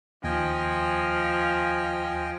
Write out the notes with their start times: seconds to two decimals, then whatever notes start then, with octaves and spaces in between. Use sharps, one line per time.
0.24 D#2 F3 D#5 G5 G#5